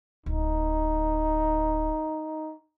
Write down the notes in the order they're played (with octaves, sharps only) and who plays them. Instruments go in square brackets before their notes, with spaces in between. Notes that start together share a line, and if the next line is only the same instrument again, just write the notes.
[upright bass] D1 [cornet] D#4